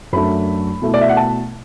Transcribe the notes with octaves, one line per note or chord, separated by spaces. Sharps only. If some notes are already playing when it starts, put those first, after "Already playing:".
F#2 F#3 A3 D4 B5
B2 A3 E4
D5
E5
F#5
A5